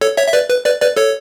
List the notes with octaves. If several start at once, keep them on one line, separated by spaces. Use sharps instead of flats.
A4 C#5
C#5 E5
E5
B4 D5
B4
B4 D5
B4 D5
A4 C#5